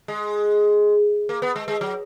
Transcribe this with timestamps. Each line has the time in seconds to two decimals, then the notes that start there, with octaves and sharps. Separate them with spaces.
0.08 G#3
1.29 A#3
1.42 B3
1.56 G#3
1.68 G#3
1.81 F#3